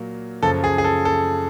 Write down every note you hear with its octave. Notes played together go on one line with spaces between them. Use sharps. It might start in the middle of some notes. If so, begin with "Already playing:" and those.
Already playing: A#2 F#3 A#3
F#2 C#3 F3 A4
G#4
G#4
A4
A4